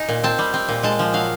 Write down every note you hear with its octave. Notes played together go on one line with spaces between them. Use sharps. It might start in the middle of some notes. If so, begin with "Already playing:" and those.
Already playing: D#4 G#5
A#2
C4 A5
G3
C4
A#2
G#3 A5
F3
F#3 F5